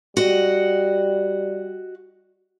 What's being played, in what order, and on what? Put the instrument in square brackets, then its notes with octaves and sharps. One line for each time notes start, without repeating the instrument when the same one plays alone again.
[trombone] G3 [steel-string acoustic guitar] F#4 D#5